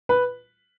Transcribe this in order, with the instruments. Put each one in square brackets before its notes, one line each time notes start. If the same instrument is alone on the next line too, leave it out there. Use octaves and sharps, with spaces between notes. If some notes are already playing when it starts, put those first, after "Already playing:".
[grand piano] B4